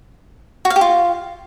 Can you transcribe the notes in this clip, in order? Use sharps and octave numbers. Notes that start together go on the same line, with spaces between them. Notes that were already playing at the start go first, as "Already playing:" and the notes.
F#4
F5
G4
F4